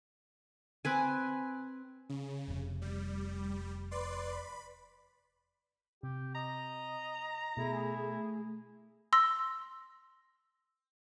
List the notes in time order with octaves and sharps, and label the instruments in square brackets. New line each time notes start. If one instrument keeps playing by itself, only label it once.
[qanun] C4 B4 G#5
[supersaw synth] C#3
[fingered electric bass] F1 C3
[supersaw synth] G3
B4 D5 C6
B5
[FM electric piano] C3 [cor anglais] G4
[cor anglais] D#5 [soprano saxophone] A#5
[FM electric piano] B2 [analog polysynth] A3 G#4 [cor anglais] E4
[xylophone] C6 E6 A#6